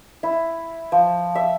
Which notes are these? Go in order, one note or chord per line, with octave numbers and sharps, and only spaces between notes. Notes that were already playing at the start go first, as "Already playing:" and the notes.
E4
F3
E5